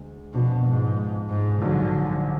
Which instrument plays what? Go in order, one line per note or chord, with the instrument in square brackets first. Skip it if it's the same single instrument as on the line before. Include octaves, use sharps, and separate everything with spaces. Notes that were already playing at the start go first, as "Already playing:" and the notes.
Already playing: [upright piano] D2 G#3
[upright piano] F2 F3 B3 D4 [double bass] B2
[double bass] G#2
G#2
[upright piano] A#1 G#2 F#3 [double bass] D3